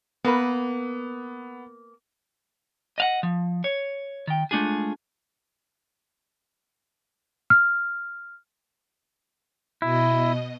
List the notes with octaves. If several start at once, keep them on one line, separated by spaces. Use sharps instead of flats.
A#3 B3 B4
D#5 F5 F#5
F3
C#5
D#3 G5
G#3 A3 D4 F4 G#4
F6
B2 E4 D#5